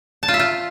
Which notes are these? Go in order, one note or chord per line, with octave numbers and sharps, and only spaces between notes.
A5
F4
E5
F4